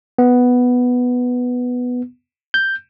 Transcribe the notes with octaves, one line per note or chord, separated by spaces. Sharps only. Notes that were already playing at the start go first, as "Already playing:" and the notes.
B3
G6